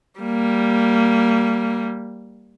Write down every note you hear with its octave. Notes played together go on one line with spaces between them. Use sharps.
G3 A#3